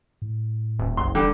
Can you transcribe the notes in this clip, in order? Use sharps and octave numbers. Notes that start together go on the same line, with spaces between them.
A2
D#1
F#1 B1 C6
D#1 D3 G3